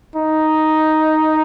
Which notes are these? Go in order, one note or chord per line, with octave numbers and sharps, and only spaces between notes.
D#4